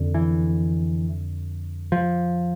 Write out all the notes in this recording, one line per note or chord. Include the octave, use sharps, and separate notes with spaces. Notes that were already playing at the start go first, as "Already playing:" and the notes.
Already playing: F2 D3
E3
F3